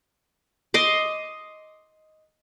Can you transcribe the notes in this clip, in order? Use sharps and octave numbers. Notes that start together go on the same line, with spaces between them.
D#5 C6 D6